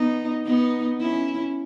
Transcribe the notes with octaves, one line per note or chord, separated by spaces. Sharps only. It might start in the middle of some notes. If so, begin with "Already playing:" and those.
Already playing: B3 D#4
B3 D#4
C#4 E4